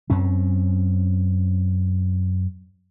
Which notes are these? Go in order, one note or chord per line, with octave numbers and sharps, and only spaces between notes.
F#2 C4 C#4